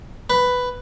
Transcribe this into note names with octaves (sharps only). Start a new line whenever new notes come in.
B4